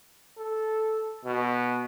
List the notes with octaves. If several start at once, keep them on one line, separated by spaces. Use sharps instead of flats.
A4
B2